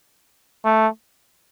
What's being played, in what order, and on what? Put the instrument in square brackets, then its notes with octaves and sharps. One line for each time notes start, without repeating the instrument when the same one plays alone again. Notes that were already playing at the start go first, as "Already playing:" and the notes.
[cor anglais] A3